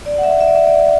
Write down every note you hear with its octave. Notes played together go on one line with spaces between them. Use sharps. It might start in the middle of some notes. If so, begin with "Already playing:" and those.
D5
F#5
E5
E5
D5
E5
D5